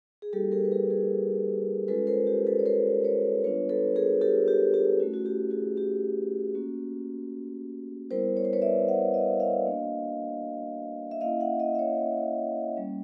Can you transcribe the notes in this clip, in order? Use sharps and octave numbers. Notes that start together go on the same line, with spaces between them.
G#4
G3 A#3 D#4 F#4 G4 A4
G#4 A#4
B4
G#4 A#4
G#4 A#4
G#3 C#4 F4 A4 B4
A#4 C5
G4
A4 B4
C#5
A#4 C5
B4 C#5
G3 B3 D4 F4 B4 C#5
A4 B4
G#4 A#4
G4 A4
G4
G4
A3 C#4 E4 F#4
F#4
G4
F#4 G#4
G4
A#3 C#4 F#4
G3 B3 E4 A#4 C5
C#5
C5
B4 C#5
D5 E5
E5 F#5
D#5 F5
D#5 F5
A#3 D4 F#4
E5
A#3 C#4 E4 D#5 F5
E5 F#5
D#5 F5
E5
C#5 D#5
G3 A#3 C#4